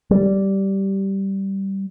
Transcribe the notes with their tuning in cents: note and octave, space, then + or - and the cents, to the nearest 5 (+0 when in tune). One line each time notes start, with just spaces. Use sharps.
G3 -10